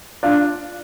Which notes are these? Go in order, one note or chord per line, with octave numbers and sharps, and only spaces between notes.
D4 F4